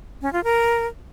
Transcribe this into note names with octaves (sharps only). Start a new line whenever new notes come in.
C#4
F4
A#4